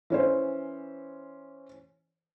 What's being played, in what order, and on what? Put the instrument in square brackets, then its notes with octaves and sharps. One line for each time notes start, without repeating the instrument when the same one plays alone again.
[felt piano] E3 C#4 C5